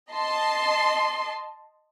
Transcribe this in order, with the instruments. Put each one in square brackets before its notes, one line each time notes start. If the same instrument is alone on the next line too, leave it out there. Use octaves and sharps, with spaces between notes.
[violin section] D#5 A5 C6